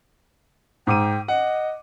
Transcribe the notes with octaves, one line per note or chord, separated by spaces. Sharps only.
G#2 G5 D6 D#7
D#5 F#5